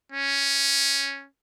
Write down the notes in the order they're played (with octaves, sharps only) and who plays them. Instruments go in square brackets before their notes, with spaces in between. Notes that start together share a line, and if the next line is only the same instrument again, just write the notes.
[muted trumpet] C#4